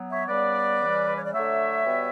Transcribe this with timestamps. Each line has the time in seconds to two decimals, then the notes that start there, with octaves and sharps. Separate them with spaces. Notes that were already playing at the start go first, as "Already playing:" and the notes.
Already playing: F#3 B3
0.11 C#5 E5
0.28 C#3 G3 B3 B4 D5
0.81 C#3 E3 G3
1.08 B4
1.16 C#5
1.25 D5
1.33 D3 F#3 A3 C#5 E5
1.86 B2 G3 B3